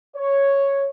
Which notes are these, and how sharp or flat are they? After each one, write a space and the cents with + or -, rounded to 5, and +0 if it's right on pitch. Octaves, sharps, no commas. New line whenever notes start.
C#5 +0